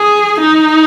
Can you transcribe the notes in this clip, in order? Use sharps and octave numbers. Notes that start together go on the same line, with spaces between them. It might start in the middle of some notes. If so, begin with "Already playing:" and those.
Already playing: G#4
D#4